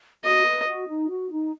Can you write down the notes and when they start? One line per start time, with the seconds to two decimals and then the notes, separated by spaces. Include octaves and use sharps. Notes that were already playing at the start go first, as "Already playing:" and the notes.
0.24 F#4 D#5
0.46 B4
0.67 F#4
0.88 D#4
1.09 F#4
1.31 D#4